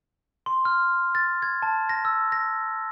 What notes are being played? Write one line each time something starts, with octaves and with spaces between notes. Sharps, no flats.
C6
F6
A6
G#6
A5
A#6
E6
A#6